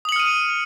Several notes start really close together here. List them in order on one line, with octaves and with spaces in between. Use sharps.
D#6 F#7 C#7 F6 D#7